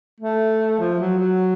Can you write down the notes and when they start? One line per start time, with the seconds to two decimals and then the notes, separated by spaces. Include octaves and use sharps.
0.20 A3
0.80 F3
0.99 F#3
1.19 F#3